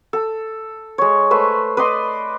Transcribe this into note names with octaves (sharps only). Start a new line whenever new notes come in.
A4
G#3 C#5
A3 B4 C5
B4 D5 D#5 C6